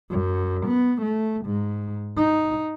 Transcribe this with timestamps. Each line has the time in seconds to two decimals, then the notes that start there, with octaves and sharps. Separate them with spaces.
0.10 F#2
0.67 B3
1.02 A3
1.46 G#2
2.17 D#4